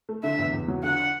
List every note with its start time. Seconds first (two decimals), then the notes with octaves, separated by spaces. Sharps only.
0.09 A3
0.23 D3 E5
0.39 E2
0.53 E2
0.68 F#3
0.83 D3 F#5